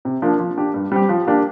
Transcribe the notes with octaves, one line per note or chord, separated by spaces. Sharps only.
C3
F3 A#3 D4
F3
D4 G4
G2
G3 C4 G4
F3
A#3 D4 G4